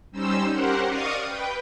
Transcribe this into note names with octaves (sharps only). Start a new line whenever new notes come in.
G3 C#4 D#4 C5 E6
C#4 G4 A#4 C5 F#5
D5 D#5 F5 C#6 D#6
B4 G5